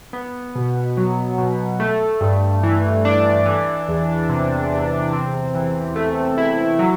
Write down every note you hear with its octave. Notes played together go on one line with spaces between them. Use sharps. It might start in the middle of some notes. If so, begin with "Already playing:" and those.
B3
B2
F#3
B2
A3
G2
E3
D4
E3
E2
C3
E2
C4
E3
A3
E4
F#3